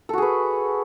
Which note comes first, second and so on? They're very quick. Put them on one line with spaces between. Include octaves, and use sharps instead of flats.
A4 F#4 G#4 B4